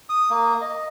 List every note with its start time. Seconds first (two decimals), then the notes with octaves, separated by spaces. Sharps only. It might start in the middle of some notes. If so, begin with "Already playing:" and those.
0.09 D#6
0.30 A#3
0.61 D#5